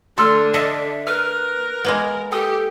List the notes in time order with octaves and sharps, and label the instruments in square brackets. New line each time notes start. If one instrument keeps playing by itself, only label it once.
[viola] D3 D4 [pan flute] A3 [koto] A4 [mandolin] C6 E6 F6
[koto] A4 D#5 [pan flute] E5
[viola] A#4 [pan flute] B4 [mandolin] F6
[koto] G#3 A#3 B3
[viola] G4 [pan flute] A4 [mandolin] G5 D#6